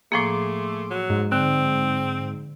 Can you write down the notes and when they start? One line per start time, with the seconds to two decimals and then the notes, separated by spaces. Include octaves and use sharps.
0.12 A2 F3 A3 A#3 G#4 C6 D6
0.90 F#3
1.10 G#2
1.32 D3 C4